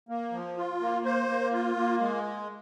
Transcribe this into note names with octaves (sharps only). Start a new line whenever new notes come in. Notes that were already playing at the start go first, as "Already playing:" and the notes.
A#3
F3
F4
A#3
C5
A#3
F4
A#3
G#3